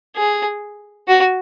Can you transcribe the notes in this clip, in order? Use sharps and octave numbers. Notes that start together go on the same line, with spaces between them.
G#4
F#4